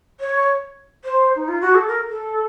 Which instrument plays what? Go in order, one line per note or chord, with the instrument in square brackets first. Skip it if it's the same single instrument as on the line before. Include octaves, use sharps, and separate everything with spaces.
[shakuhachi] C#5
C5
D#4
F4
F#4
A4
A#4
A4